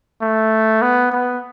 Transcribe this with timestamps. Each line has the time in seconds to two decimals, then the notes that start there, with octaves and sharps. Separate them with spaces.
0.21 A3
0.82 B3
1.12 B3